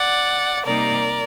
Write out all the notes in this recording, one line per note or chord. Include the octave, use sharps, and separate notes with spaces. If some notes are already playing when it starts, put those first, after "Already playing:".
Already playing: D5 F#5
C3 G3 A#3 D#4 A#4 D5